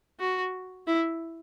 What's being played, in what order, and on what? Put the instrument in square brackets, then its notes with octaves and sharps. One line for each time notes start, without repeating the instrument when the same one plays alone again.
[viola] F#4
E4